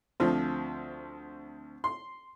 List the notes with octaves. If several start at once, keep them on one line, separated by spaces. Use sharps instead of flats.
D2 F3 C4
C6